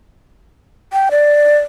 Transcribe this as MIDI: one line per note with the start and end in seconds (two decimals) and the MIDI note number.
0.93 1.09 79
1.11 1.58 74